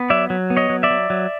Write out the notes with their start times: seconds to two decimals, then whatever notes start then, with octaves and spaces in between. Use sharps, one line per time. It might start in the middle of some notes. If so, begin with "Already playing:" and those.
Already playing: B3
0.10 F#3 D5 E5
0.30 F#3
0.50 B3
0.57 C#5 D#5
0.70 F#3
0.83 D5 E5
0.90 F#3
1.10 F#3